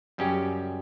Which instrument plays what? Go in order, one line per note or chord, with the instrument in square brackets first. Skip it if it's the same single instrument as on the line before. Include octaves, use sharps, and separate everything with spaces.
[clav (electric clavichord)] F#2 C#3 G3 C#4 G4